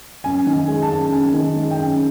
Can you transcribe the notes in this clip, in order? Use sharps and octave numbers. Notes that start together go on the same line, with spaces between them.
F#2 G#5
D#3
G#5
G#3
A5
F#2
F#2 G#5
D#3
G#3
G5
F#2